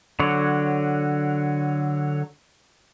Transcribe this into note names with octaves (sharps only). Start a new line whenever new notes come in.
D3 F#3 C#5